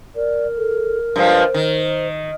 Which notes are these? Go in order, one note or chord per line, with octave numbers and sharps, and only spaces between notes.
A#4 D5
A4
G2 F3 G#3 C5
D#3